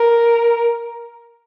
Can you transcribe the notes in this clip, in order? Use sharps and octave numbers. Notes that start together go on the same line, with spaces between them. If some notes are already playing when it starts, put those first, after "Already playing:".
Already playing: A#4